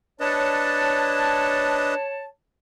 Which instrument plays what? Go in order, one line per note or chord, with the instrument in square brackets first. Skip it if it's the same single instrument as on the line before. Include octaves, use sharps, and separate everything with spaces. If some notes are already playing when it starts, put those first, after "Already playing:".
[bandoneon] D4 B4 D#5 [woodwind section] C#5 A5